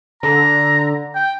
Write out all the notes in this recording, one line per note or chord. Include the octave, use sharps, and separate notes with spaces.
D3 A#5
G5